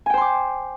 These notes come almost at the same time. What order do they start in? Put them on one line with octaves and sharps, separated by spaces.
G#5 G5 C5 C6 D6